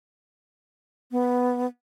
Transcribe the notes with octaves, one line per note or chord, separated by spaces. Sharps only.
B3